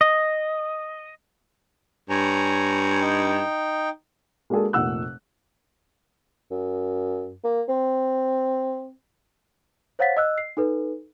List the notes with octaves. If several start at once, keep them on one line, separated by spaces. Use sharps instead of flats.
D#5
G2 C#5 G#5 A#5
D#4 G5
G#3 A#3 D4 F#4 G#4 A4
F1 A#2 F#5 E6 F#6
F#2
A#3
C4
C5 C#5 F5 F#5 A6 B6
D#5 E6 F#6
C7
D#4 A4 B4